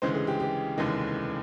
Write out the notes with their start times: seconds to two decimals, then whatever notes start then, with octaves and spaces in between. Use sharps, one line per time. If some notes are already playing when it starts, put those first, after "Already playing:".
0.02 D2 C#3 E3 G#3 C5
0.14 G#4
0.27 G4
0.40 G4
0.78 F1 D#2 C#3 E3 G#3